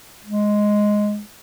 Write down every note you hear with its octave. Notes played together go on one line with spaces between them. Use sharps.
G#3